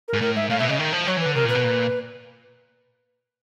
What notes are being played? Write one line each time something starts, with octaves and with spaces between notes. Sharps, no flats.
A#4
G#2
A2 A#4
G#2 E5
A2 F5
B2 E5
C#3 D#5
D#3
F3
F#3 C#5
E3 B4
D3
C3 A#4
A#2 B4
B2
A#2